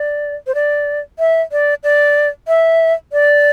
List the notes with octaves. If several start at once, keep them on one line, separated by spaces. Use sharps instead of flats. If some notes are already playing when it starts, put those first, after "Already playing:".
Already playing: D5
C5
D5
E5
D5
D5
E5
D5